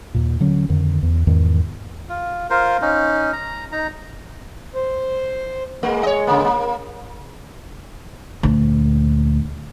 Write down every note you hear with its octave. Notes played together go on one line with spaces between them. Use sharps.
D#2 A#2
D3 F#3 C#4
F2 D3 D#3
E2
E2 G#2 D#3
F4
F4 A#4 C5
C#4 D#4
A#5
D#4 A#5
C5
G#3 A3
C#5 D#5
C#3 A#3
A#3
D2 A#2